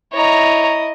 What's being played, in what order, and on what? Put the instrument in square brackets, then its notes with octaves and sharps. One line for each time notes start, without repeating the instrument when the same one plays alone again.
[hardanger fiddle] E4 D#5 [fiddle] C#5 A#5